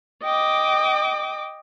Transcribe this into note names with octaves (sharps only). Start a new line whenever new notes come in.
D#5 G5 D6